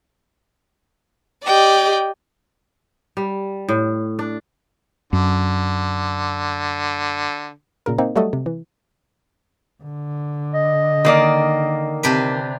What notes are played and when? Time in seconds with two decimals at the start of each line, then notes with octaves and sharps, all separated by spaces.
1.46 G4 D5 D#5 G5
3.17 G3
3.69 A2
4.19 D4
5.13 F#2 D3
7.86 A#2 C#3 A#4
7.98 A#3 C4 D#4
8.16 F#3 G3 A3 F#4 A4 D#5
8.33 C3
8.46 E3
9.83 D3
10.53 D#5
11.05 D#3 A#3 D5
12.03 C3 D4 B4